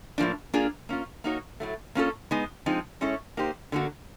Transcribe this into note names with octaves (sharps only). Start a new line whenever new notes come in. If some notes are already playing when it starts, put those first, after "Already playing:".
A2 F3 A#3 D4
A#3 D4 F4 G#4
A#3 C#4 F4
A#3 D#4 F#4 A#4 C#5
A2 F#3 A3
A#3 C#4 F4 A4
G#3 B3 D#4
F3 G#3 C4 D#4
G#3 C#4 E4 A4 C#5
A#3 D#4 G4 C5
D3 F#3 A#3 D4 F#4